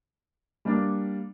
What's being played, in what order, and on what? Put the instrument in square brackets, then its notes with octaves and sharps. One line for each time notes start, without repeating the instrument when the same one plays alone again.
[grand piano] G3 A#3 D4